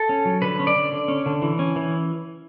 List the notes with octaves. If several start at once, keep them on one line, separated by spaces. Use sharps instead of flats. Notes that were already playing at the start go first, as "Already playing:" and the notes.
Already playing: A4
C#4
F#3
D3 B4
C#4
D5
D3
D3
C#4
D3
E3
C#4
E3